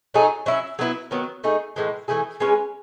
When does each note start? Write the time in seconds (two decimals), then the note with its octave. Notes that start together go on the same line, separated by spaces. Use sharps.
0.14 F#3 A3 D#4 G#4
0.46 F#3 C#4 E4
0.79 F#3 B3 E4 B4
1.11 D#3 F#3 B3
1.44 A3 D#4 G#4
1.76 A2 E3 G#3
2.08 E3 A3 E4 G#4
2.40 G#3 C#4 G#4 B4